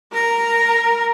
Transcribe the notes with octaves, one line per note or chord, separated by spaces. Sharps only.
A#4 A#5